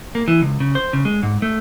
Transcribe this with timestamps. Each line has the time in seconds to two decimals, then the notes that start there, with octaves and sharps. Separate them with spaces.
0.15 A#3
0.28 E3
0.42 C#2
0.60 C#3
0.75 C5
0.93 C#3
1.05 G#3
1.23 G#2
1.42 A3